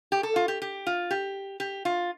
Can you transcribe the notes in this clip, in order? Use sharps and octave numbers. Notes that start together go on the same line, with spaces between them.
G4
A4
F4
G4
G4
F4
G4
G4
F4